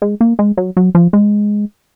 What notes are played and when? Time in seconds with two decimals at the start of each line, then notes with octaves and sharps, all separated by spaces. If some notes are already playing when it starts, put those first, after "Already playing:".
0.02 G#3
0.21 A#3
0.39 G#3
0.57 F#3
0.77 F#3
0.95 F3
1.13 G#3